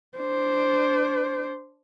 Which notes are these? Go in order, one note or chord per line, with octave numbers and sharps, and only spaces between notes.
D4 C5